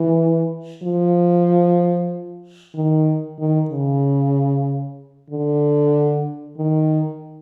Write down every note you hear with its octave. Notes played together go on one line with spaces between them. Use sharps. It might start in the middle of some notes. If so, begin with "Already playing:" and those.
Already playing: E3
F3
D#3
D#3
C#3
D3
D#3